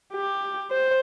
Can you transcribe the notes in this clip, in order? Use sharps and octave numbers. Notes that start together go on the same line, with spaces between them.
G4
C5